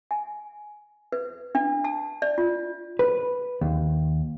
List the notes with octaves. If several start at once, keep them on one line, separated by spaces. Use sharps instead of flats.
G#5
B4
D4
A5
D5
F4
B4
D#2